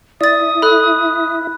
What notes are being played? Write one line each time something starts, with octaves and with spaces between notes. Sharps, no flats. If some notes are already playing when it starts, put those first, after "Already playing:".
E4 D5 E5 D#6 A6
A4 B5 F#6